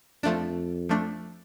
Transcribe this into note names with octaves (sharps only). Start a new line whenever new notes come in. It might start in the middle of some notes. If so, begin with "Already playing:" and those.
F2 F3 A3 D4
F3 A3 D4